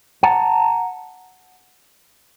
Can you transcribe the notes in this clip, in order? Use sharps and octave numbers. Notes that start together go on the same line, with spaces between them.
F#5 A5 A#5